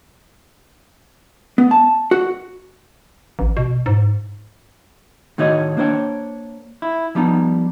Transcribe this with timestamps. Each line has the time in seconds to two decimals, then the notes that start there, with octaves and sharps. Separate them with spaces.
1.58 B3
1.71 A5
2.11 F#4
3.39 A1
3.57 B2
3.86 G#2
5.38 A2 D#3 D#4 F#4 C#5 D#5
5.77 A#3 D4 C5 C#5 G5
6.82 E4
7.15 F3 G3 B3 D#4